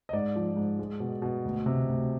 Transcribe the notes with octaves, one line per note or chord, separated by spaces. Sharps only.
D#5
G#2 D5
F3
G#2
G#3
B2
B2
D2
C3
D2